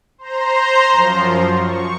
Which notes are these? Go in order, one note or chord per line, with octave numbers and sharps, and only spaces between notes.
C5 A#5 C6
F#2 F3
C#6